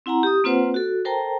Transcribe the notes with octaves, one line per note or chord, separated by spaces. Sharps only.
C4 E4 F#5 G#5 A#5
G4 D#6
A#3 C4 F4 B4 C5 F#5
F#4 A4
A4 A#4 C5 G5 A5 A#5